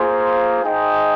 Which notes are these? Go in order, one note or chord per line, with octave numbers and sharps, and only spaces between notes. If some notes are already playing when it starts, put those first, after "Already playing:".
Already playing: A#3 F4 G#4 C5
D#4 G#4 C5 D#5 G5